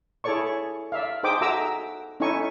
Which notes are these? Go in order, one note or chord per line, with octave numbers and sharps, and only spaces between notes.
E4 G#4 A4 C#5 D5 C#6
D5 E5 F5
D#4 G#4 C5 G5 D6 D#6
F#4 A4 E5 A#5 D6 E6
C#4 D#4 E4 A4 G#5 C#6